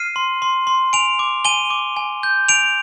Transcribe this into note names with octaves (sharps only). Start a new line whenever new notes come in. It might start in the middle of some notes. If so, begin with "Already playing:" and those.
Already playing: F6 C7 D#7
C6
C6
C6
G#5 D7 F7
D6
G#5 D#7 G7
D6
G#5
G6
G#5 D7 F7